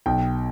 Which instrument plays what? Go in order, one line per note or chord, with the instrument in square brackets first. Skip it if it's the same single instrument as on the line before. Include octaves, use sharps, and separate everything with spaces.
[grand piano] B1 G5